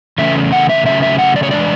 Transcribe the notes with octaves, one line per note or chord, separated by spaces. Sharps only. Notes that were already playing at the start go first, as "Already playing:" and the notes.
C#3 E3 A3 C#4 E5
F#5
E5
C#3 F#3 A3 C#4 E5
E5
F#5
D5
C#5
E3 G#3 D4 D5